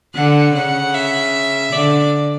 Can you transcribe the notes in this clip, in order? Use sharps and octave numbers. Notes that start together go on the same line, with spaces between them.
D3 F#5
C#3 F#5
E5
D3 D5